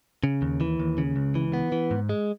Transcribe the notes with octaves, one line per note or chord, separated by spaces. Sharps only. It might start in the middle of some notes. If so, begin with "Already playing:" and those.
C#3
D#2
E3
D#2
C#3
C#2
E3
B3
E3
G#2
G#3